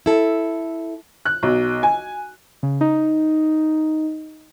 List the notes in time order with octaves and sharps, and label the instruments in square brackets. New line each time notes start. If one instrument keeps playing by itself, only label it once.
[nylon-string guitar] E4 A4
[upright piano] F#6
B1
G#5
[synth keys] C#3
D#4